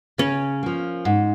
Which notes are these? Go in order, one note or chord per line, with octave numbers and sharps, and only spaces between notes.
C#3 C#4
F3 A#3
G#2